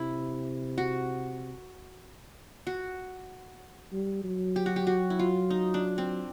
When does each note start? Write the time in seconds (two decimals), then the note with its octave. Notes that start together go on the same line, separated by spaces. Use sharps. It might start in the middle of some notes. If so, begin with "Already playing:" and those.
Already playing: C3 E4
0.78 F#4
2.67 F#4
3.93 G3
4.24 F#3
4.56 G4
4.66 F#4
4.76 G4
4.87 F#4
5.10 E4
5.19 F4
5.50 D#4
5.74 D4
5.98 C4